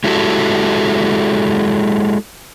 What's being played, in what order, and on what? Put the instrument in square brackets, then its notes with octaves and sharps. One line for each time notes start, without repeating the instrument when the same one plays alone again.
[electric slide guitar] G#3 E4 F#4 G4 A4